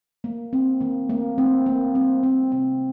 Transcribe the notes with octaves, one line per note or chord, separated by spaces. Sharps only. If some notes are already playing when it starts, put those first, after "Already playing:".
A3 A#3
D#3 C4
D#3 A#3
A3 A#3
A3 C4
D#3 A#3
G3 C4
A#3 C4
C3 C4